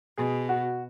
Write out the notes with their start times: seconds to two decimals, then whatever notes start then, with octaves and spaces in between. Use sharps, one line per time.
0.17 B2 G#4
0.49 F#4